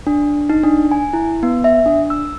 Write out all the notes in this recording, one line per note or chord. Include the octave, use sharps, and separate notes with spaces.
D4
D#4
D4
G#5
E4
B3
E5
D4
E6